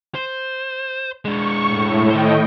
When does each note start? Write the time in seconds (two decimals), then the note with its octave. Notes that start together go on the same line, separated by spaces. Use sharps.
0.15 C5
1.25 G#3 D4 C#6
1.67 A2
2.10 A2 D#3 C5 D#5 G5